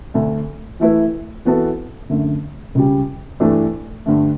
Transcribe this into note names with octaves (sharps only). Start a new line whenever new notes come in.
D2 D3 A3
E3 A3 E4 B4
E3 B3 F#4 A4
F#2 D3 A3
C#2 C#3 G3
G2 E3 A3 D4 A4
G2 D3 A3